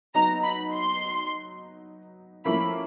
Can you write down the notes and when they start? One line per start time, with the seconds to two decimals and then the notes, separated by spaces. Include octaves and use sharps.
0.15 F#3 B3 D#4 A#5
0.43 B5
0.72 C6
2.45 A2 F3 A#3 C#4 E4 B5